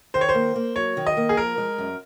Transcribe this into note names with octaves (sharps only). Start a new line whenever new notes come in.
D#3 C5
C#5
C5
A#3
A#3
F#3 C#5
D#3
D#5
A#3
G#4
F3 A#4
G#3
F#2